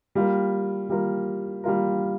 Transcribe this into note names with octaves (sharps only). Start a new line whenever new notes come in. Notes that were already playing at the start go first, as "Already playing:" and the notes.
G3 A#3 F4 A#4
G3 A#3 F4 A#4
G3 A#3 F4 A#4